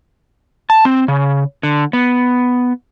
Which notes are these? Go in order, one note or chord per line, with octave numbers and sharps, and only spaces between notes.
A5
C4
C#3
D3
B3